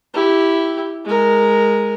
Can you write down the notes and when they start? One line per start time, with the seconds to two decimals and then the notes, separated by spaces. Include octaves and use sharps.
0.14 E4 G4
1.05 G#3 A#4